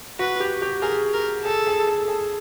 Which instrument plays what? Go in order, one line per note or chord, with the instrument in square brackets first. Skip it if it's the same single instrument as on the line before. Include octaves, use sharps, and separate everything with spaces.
[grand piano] F#4 [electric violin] B4
[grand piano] G4
G4
[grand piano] G#4 [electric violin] A#4
[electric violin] A#4
[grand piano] G#4 [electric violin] A4
[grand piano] G#4
A4
G#4